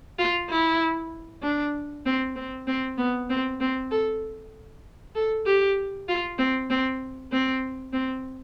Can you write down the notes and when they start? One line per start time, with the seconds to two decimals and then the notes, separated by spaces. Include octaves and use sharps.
0.19 F4
0.50 E4
1.43 D4
2.06 C4
2.36 C4
2.67 C4
2.98 B3
3.30 C4
3.60 C4
3.91 A4
5.15 A4
5.46 G4
6.08 F4
6.38 C4
6.70 C4
7.32 C4
7.93 C4